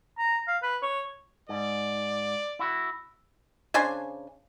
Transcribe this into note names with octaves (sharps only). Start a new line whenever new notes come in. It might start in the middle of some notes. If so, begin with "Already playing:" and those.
A#5
F5
B4
C#5
G#2 D5
E4 F#4
C#3 D4 C5 G#5